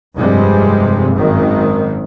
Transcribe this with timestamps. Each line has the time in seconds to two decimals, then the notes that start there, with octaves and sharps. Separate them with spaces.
0.17 F1 G2 C3 G3 G#3
1.15 G#1 F#2 D#3